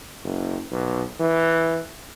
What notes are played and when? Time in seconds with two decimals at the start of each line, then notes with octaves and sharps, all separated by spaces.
0.24 F#1
0.71 B1
1.20 E3